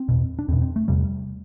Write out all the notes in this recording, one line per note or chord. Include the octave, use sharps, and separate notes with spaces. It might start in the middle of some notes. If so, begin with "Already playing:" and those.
Already playing: C4
E2 B2
D4
E2 B2 C4
C4
A3
E2 C3 G3